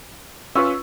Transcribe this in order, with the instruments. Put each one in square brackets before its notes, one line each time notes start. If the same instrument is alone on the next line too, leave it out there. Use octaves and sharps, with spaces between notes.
[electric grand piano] C#4 F4 B4 [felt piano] C#5 C#6 E6